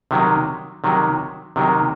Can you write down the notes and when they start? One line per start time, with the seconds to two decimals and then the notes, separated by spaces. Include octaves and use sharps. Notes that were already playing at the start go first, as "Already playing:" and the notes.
0.11 C3 D#3 F#3
0.84 C3 D#3 F#3
1.56 C3 D#3 F#3